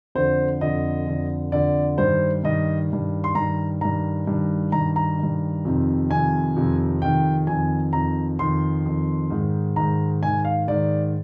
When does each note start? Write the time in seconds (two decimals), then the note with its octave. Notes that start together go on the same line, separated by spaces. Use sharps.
0.15 F2 D3 C5
0.61 F2 D3 D#5
1.07 F2 D3
1.52 F2 D3 D5
1.98 G2 D#3 C5
2.44 G2 D#3 D#5
2.90 G2 D#3
3.24 C6
3.35 G2 D#3 A#5
3.81 G2 D#3 A#5
4.27 G2 D#3
4.72 G2 D#3 A#5
4.96 A#5
5.19 G2 D#3
5.65 F2 C3 D#3
6.10 F2 C3 D#3 G#5
6.56 F2 C3 D#3
7.01 F2 C3 D#3 G5
7.47 F2 D#3 G#5
7.93 F2 D#3 A#5
8.39 F2 D#3 C6
8.86 F2 D#3
9.30 G#2 D#3
9.76 G#2 D#3 A#5
10.23 G#2 D#3 G#5
10.45 F5
10.68 G#2 D#3 D5